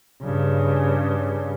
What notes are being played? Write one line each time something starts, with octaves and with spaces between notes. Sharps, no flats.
G2 C#3